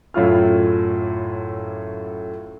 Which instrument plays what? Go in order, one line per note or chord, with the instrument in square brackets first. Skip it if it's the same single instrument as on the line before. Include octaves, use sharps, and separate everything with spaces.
[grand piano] F#2 A2 F#3 E4 F4 F6